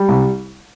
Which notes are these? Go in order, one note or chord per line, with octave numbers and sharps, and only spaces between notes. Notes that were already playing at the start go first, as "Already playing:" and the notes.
Already playing: G3
C2